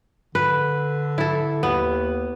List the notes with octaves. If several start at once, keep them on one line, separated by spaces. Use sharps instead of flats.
D3 B4
E4 A4
D#2 B3